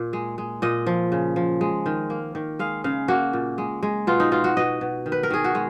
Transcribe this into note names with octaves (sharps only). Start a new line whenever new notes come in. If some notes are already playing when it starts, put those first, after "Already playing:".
Already playing: A#2
G#3
G#3
A#2 D#5
F3
C#3
F3
G#3
D#3
A#3
D#3
G#3 F5
C#3 F5
A#3 F#4
A#2
G#3
G#3
B2 F4
D#4
B2 F4
F#4
B2 D#5
B2
D#3
B4
A#4
D#3 G#4
F#4
G#3